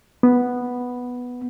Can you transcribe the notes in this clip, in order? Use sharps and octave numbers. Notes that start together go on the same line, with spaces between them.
B3